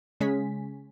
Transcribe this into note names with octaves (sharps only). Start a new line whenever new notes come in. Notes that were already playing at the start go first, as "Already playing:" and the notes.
C#3 G#3 C#4 G#4 G#5 B6